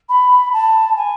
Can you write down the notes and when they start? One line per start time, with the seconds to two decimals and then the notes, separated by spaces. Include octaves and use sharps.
0.09 B5
0.53 A5
0.96 G#5